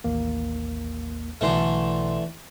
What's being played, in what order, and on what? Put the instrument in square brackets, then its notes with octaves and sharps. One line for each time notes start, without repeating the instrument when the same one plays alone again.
[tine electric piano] A1 D#2 A#3
[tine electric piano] B1 B2 C6 [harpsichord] D3 E3 A3